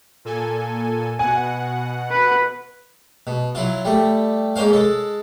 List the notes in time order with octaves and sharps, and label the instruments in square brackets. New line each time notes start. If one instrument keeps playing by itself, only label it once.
[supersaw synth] A#2 A4 G#5
[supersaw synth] B2 F#5 [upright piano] G#5
[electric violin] B4
[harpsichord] B2
F#3 E4 F4
G3 A3
G#2 A#3 C#4 C5 F5
G#3 A4